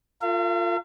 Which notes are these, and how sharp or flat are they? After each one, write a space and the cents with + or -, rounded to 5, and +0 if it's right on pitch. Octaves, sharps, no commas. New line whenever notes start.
F4 +0 A#4 -45 F5 -45